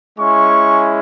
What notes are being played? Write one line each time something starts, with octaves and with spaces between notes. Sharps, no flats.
G#3 C#4 E4 C#6